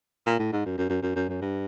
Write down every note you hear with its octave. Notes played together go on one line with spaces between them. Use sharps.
A#2
A2
G#2
F#2
F#2
F#2
F#2
F#2
F#2
G2